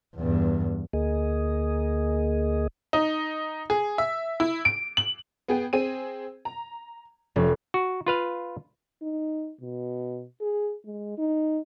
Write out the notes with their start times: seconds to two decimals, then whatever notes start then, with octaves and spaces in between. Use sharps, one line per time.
0.16 E2 G2
0.93 D2 A#3 G#4 D#5
2.93 D#4
3.70 G#4
3.98 E5
4.40 E4
4.65 D7
4.97 F#7
5.48 B3 G#4 G5
5.73 C4 G#4 D#7
6.45 A#5
7.36 F1 C#4
7.74 F#4
8.06 F4 B4 F5
9.02 D#4
9.61 B2
10.41 G#4
10.85 G#3
11.18 D#4